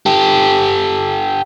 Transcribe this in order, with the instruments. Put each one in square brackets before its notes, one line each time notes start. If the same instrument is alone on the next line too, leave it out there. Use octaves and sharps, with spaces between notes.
[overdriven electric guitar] G4 A4